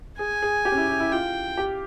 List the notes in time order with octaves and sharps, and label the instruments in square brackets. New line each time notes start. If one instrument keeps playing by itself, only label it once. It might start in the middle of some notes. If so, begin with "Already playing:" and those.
[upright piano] G#4 [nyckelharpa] G#5
[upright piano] G#4
G4
C#4
E4
E4
E4
[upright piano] F4 [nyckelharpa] G5
[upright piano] G4